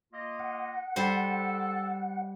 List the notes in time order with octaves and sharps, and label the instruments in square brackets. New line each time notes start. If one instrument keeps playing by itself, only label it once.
[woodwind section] A#3 F4 D#5
[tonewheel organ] F#5
[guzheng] G3 C5 [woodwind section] A4